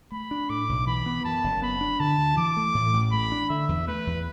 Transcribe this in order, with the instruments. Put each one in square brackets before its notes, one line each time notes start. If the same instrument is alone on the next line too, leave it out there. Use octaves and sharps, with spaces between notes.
[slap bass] A3 [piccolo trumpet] B5
[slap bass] D4
[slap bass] A2 [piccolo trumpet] D6
[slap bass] B1
[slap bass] E3 [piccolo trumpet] B5
[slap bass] B3
[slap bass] F#2 [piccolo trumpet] A5
[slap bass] F#1
[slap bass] B3 [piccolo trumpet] B5
[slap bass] D4
[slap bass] D3 [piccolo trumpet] A5
[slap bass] D2
[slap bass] E3 [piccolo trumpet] D6
[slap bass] A3
A2
A1
[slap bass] A3 [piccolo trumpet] B5
[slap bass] D4
[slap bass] D3 [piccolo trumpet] E5
[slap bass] E2
[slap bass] A3 [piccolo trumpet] B4
[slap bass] E2